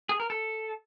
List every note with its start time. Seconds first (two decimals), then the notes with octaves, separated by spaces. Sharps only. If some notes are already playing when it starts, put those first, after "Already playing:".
0.09 G#4
0.20 A#4
0.30 A4